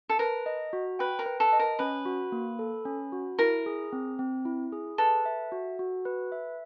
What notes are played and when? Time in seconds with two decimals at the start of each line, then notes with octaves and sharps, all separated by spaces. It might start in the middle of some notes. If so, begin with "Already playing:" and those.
0.09 A4
0.19 A#4 B4
0.46 D#5
0.73 F#4
0.99 B4 G5
1.19 A#4
1.26 B4
1.40 A4
1.53 D#5
1.59 A#4
1.79 C#4 B4
2.06 F#4
2.32 A#3
2.59 A4
2.85 C#4
3.12 F#4
3.39 E4 A#4
3.66 G#4
3.93 C4
4.19 C4
4.45 E4
4.72 G#4
4.98 A4 B4
5.26 E5
5.52 F#4
5.79 F#4
6.05 B4
6.32 E5